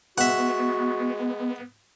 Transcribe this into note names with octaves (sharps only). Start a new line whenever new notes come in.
G#3 B3 F#4 E5 F#5